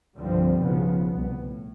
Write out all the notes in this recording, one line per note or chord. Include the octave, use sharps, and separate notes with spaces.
C2 G2 D3 F3 G3 C4
B1 C#3 F3 B3
C2 B3
A2